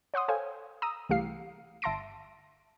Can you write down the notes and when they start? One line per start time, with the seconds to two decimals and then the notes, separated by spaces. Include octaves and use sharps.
0.14 C#5 F#5 C6 D#6
0.28 A4 C5 C#5 F5 G5 G#5
0.82 A#5 D#6 E6
1.09 C2 E3 A3 G4 F5 C7
1.82 G1 E5 A5 C6 A#6 D7